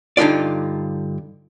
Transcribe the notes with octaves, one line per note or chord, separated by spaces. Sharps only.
G2 D3 D#4 F4 D5